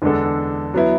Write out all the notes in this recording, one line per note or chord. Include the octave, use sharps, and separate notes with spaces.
E2 D3 G#3 D4 A4
F#3 B3 E4